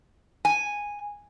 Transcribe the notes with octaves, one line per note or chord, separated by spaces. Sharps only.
G#5